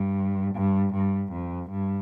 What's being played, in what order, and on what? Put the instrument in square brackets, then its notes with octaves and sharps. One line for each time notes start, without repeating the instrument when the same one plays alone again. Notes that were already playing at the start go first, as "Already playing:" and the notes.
Already playing: [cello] G2
G2
G2
F2
G2